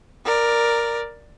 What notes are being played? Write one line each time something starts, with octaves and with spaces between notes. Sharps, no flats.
A#4 D5